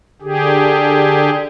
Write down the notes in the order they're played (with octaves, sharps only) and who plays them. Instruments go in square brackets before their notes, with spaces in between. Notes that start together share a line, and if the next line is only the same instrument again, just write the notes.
[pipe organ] D3 G4 G#4